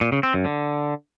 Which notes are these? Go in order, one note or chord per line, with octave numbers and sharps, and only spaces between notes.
A#2
C#3
C4
F#2
D3